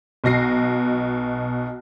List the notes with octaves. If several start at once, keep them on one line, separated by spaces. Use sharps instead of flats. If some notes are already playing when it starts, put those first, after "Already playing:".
B1 B2 A#6 C7